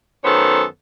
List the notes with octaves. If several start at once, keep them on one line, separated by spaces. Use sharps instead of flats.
F#2 D#3 B3 A4 C5 C#5